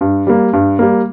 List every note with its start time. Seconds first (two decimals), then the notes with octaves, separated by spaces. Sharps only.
0.01 G2
0.27 G3 A#3
0.53 G2
0.79 G3 A#3